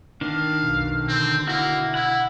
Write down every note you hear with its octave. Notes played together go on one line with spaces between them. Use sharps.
D#3 D4 F5
B1 F2
B2 D3 C4
A#3 E4 F#4
E4 F#5